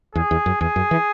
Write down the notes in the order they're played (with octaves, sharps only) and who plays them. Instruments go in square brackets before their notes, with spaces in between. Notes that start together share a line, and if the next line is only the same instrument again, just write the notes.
[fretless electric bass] E2 [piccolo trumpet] G#4
[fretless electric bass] E2
F#2
[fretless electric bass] E2 [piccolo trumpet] G#4
[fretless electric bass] F#2
E3